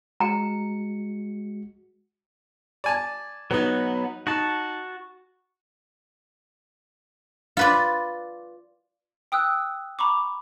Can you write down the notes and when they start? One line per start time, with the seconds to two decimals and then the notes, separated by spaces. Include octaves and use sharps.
0.20 G#3 F#4 A#5 C#7
2.84 D5 G#5 A5
3.51 F#3 B3 D#4 B4
4.27 D#4 F#4 A5
7.57 F4 B4 D5
9.32 G5 D#6 E6 F#6
9.99 A#5 B5 C#6 D6